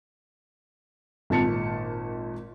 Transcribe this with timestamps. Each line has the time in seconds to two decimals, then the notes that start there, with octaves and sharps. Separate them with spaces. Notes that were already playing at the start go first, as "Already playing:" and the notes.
1.30 G#1 A#2 A5 C#7